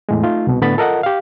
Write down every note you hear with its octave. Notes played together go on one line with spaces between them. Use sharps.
E2 A2 G#3
A3 D#4 F4
C2 B2
A2 D3 B3 B5 A6
F4 A4 A#4 D#5 F#5
G4 F5